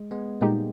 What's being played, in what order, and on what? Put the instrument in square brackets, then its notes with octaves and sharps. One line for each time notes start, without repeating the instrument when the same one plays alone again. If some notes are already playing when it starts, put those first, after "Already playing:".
Already playing: [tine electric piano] G#3
G#3 B3
[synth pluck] A#2 G#3 D#4 G4 [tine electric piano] G3 A#3